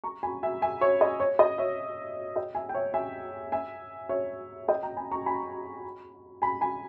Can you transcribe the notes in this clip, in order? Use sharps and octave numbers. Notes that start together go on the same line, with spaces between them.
A#5 C#6
G#5 B5
E5 G#5
E5 G#5
C#5 E5
D#5
C#5
D#5
C#5 E5
D#5 G5
E5 G#5
G5
C#5 E5
E5 G#5
E5 G#5
C#5 E5
D#5 G5
G5 A#5
G#5 B5
A#5 C#6
G#5 B5
G#5 B5
G#5 B5